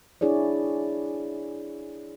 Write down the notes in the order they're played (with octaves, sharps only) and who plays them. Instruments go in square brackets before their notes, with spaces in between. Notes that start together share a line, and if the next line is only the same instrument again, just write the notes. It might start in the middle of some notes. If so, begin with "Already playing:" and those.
[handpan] D4 E4 G#4 C#5 D5